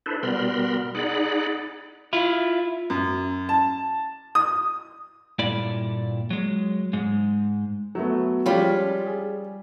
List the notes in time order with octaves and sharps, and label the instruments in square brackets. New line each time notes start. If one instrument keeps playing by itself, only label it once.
[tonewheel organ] D4 E4 A4 B4 C5
B2 G3 B3 A#4 B5 C6
D#4 G#4 D5 F#5 B5
[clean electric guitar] E4 F4
[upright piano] F#2
A5
D#6
[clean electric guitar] G2 A#2 E4 A4 D5 B5
F#3 G#3
G#2 G#3
[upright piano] F#3 A3 B3
[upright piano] F3 G#3 [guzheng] G3 B5 [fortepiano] C#4 F4 G4
[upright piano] G#4